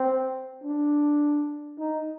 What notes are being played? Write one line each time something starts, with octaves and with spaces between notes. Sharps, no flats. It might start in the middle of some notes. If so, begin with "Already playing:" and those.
Already playing: C4
D4
D#4